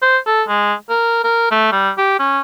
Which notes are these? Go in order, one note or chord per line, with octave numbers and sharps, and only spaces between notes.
C5
A4
G#3
A#4
A#4
A3
G3
G4
C#4